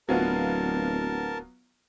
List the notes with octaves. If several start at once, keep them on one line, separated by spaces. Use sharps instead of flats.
D1 F#3 B3 F4 A#4 A5